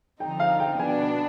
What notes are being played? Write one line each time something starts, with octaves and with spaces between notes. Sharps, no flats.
D3 F3 C4 D#4 G5
F5
G5
B2 B3 D4 G#5